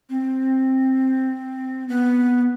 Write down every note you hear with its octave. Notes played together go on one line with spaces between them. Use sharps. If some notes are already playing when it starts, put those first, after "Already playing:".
C4
B3